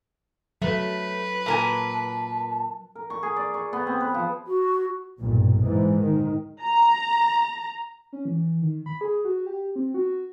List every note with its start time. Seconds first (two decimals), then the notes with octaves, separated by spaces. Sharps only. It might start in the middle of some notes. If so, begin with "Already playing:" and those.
0.62 F#3 A3 B4
1.46 A#2 A#4 G#5 A5
2.95 A#4
3.10 C#6
3.23 G#4
3.36 D5
3.54 C#6
3.73 B3
3.87 C4
4.00 B4
4.14 F3
4.47 F#4
5.19 B1 G2 A#2
5.58 G#2 E3
5.99 D#3
6.61 A#5
8.13 C#4
8.25 E3
8.62 D#3
8.86 B5
9.01 G#4
9.25 F#4
9.46 G4
9.76 C4
9.94 F#4